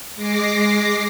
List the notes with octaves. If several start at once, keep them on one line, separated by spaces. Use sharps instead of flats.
G#3 D6 A#6 C7